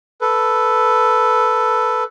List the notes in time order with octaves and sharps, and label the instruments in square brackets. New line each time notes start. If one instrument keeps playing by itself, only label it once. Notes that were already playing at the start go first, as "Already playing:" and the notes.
[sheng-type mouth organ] A4 B4